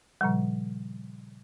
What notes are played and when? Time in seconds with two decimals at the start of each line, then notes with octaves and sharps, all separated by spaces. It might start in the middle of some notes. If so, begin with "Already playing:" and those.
0.21 A#2 C#3 F3 G3